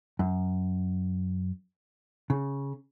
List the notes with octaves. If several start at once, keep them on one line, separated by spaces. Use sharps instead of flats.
F#2
C#3